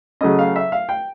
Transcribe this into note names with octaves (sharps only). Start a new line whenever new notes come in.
C#3 F#3 A3 C#4 D#5
F5
E5
F5
G5